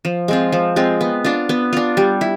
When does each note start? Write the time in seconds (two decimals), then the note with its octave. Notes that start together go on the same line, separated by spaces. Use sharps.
0.05 F3
0.28 G#3 C4 F4
0.52 F3
0.76 G#3 C4 F4
1.01 B3
1.25 D4 F4
1.49 B3
1.73 D4 F4
1.97 G3
2.21 E4